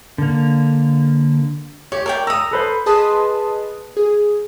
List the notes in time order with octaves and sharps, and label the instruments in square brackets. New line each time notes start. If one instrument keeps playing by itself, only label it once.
[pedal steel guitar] D3 A#3
[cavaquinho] G4 [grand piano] C#5
[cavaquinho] A#4 D5 G5
[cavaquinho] A#5 D#6 [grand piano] E6
[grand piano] A4 B4 C5
[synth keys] G#4 B4 D#5 A5 C6 D#6
G#4